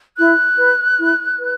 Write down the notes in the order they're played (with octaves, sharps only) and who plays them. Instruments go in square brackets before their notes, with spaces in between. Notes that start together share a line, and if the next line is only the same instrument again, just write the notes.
[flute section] E4 F#6
B4
E4
B4